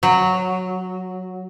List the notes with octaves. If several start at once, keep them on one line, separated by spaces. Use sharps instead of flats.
F#3